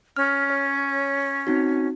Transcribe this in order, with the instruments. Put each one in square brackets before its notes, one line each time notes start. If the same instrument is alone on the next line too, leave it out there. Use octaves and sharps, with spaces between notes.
[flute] C#4 [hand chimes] F6
[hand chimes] C#5
C4 D#4 F#4